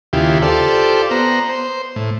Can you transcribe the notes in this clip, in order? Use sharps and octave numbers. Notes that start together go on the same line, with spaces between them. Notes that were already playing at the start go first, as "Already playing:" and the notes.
D#2 C#3 E4 F4 G4
F4 G4 A4 C5 D5
B3 C5 A#5
C5
A2